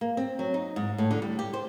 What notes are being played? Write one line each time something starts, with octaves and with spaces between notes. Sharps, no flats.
A#3
C4
F#3
D#4
G#2
A2
D3
G3
G4
C5